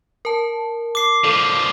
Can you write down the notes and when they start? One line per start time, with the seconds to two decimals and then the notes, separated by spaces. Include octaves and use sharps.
0.25 A#4 A5
0.95 D6 C7
1.24 D3 F3 A4